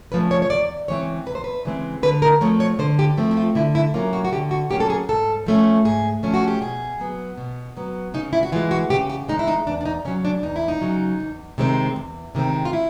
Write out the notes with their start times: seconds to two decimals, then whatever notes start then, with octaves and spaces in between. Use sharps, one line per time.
0.12 C#3 F3 A3 C#4 B4
0.31 C#5
0.42 C#5
0.50 E2 D5
0.88 C#3 E3 G#3 C4 C#5
1.26 E2 B4
1.35 C5
1.44 B4
1.65 C#3 E3 G#3 C4
2.03 D3 B4
2.22 A#4
2.41 F3 A3 C4 C#5
2.60 C#5
2.79 D3 C5
2.99 G4
3.17 F3 A3 C4
3.31 E4
3.37 F4
3.55 D3 E4
3.75 E4
3.94 F#3 A#3 C#4 F4
4.13 F#4
4.25 F#4
4.32 D3 G4
4.51 F#4
4.70 F#3 A#3 C#4 G4
4.80 A4
4.90 G#4
5.09 G#2 A4
5.46 F3 A3 C#4
5.85 G#2 G#4
6.23 F3 A3 C#4
6.34 F#4
6.48 G4
6.61 B2 G#4
7.00 F#3 B3
7.37 B2
7.77 F#3 B3
8.14 C#3 D#4
8.33 E4
8.43 F#4
8.52 E3 F4
8.56 G#3
8.71 F#4
8.90 C#3 G4
9.10 G4
9.29 E3 G#3 D#4
9.39 E4
9.48 D#4
9.67 E2 D4
9.81 D4
9.85 D#4
10.05 C#3 F#3 C#4
10.25 D4
10.43 E2 D#4
10.56 E4
10.68 D#4
10.82 C#3 F#3
11.20 E2
11.58 C3 D#3 G#3 C4
11.96 E2
12.35 C3 D#3 G#3 C4
12.65 F4
12.73 E4